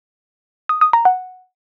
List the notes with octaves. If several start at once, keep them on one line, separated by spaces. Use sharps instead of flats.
D#6
D#6
A#5
F#5